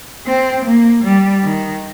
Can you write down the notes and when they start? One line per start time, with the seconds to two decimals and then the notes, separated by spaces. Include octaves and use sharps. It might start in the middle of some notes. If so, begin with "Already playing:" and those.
0.26 C4
0.65 A#3
1.03 G3
1.43 D#3